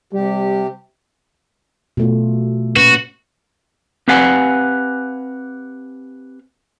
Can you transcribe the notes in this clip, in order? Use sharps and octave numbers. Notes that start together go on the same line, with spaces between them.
C3 G3 G4
B2 A3 F4
A#2 C#4 F#4 B4
C4 G4 B4 F5 F#5 G#5